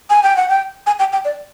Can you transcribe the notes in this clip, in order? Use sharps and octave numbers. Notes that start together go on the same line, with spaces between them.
G#5
G5
F#5
G5
G#5
G5
G5
D5